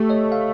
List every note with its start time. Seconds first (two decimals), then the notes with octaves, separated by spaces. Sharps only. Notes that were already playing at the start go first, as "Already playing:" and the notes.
Already playing: A3 G4 A4
0.09 C#5 D#5
0.32 F5